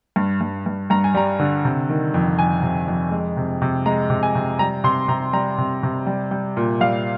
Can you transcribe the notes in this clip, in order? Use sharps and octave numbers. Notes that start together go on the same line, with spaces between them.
G2
G2
G2
G2 A#5
G#5
G3 A#5
D3
C3
D#3
F2
F2 G#5
C3
F2
G#3
C3
C3
G#3 A#5
C3
G#5
C3
G3 A#5
C3 C6
C3 A#5
G3 A#5
C3
C3
G3
G3
A#2
G3 F5